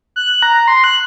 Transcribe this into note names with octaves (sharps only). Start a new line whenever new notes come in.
F#6
A#5
C6
F#6